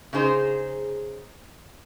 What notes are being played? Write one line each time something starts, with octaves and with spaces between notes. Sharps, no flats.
C#3 D#4 G#4 C5